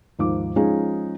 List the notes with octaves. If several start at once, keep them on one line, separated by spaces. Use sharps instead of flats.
D#2 G#2 F3 D6
F3 G#3 C#4 D#4 F4 G#4